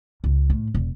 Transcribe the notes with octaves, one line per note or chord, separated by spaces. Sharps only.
C#2
A2
E1